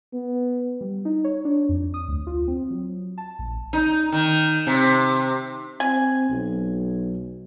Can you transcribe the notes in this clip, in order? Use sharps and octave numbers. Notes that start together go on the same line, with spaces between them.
B3
G3
D#4
C#5
D4
F2
D#6
D2
F4
C4
F#3
A5
A#1
D#4
D#3
C3
C4 G#5
B1